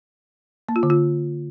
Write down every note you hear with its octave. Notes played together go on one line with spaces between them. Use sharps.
A#3
F4
D3
F4